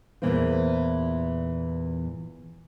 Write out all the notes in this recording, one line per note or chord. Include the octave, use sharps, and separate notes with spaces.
E2 A#2 E3 A#3 E4 C5